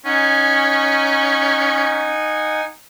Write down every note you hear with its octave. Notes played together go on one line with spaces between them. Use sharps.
C#4 D#4 F#5 G#5